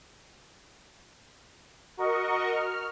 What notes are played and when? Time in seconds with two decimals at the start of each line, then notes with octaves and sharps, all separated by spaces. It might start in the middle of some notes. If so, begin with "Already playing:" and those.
1.97 F#4 A#4 D#5 C#6
2.52 F6